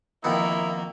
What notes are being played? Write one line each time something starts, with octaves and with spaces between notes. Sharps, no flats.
F2 D#3 A#3 B3 E4